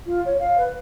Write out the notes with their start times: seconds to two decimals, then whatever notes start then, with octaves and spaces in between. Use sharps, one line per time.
0.06 F4
0.25 C#5
0.39 F5
0.58 B4